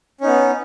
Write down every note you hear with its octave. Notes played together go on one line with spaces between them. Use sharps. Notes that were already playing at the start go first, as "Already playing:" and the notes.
B3 C#4 D#4